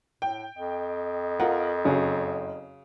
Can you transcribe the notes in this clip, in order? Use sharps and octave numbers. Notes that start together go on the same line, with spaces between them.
A2 G5
F2 D#5
F4 A#4 F#5
F#1 C#3 F#3